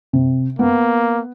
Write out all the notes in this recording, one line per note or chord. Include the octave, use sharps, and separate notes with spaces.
C3
A#3 B3